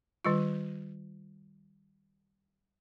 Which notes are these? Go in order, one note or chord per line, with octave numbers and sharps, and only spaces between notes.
D#3 G3 F4